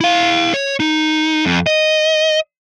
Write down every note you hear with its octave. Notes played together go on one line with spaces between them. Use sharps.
E4 F5
C#5
D#4
F2
D#5